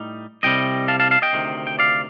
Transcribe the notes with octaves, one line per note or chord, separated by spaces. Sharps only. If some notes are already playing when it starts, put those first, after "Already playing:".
Already playing: A2 G3 D#4
C2 C3 G3 D#5 G5
F5 A5
F5 A5
F5 A5
D#5 G5
D2 C3 D#3
G5
D5 F5